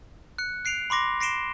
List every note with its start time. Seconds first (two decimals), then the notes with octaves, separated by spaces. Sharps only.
0.38 F#6 C#7
0.65 F#6 C7 D7 F7
0.90 B5 C6 D6 A#6
1.20 A#6 C7 D7 E7 G7